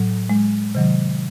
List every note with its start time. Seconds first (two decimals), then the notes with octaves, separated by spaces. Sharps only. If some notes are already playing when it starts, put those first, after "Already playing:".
Already playing: A2 F#3
0.30 G#3
0.75 C3 D#3 F#3